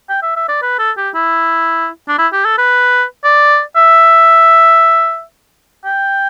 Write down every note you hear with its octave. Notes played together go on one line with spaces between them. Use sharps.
G5
E5
E5
D5
B4
A4
G4
E4
D4
E4
G4
A4
B4
D5
E5
G5